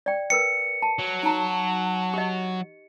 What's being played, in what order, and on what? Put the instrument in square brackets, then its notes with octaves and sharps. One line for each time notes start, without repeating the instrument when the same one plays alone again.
[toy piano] D5 G5
[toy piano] A#4 B4 G5 [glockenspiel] C#7
[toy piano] A5
[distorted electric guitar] F#3
[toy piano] D#4 A#5 [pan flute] A5
[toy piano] G4 D#5